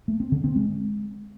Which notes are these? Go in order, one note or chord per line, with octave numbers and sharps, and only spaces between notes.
A3
C4
D3
C4
G#3